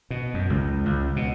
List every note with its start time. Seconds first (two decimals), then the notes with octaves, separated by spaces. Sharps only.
0.10 B2
0.34 F#2
0.50 C#2
0.85 C#2
1.16 B2